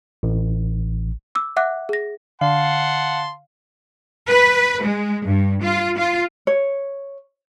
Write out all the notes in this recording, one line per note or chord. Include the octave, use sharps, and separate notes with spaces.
A1
D6 E6
E5 F#5 D6 F#6
G#4 A#6
D3 F5 F#5 A5 C6
B4
G#3
G2
F4
F4
C#5